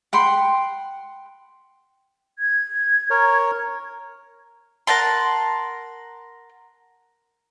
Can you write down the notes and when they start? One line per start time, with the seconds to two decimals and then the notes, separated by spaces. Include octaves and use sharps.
0.13 F#5 G5 B5 C6
2.39 G#6
3.10 A#4 C#5
4.87 A#4 F#5 A5 C6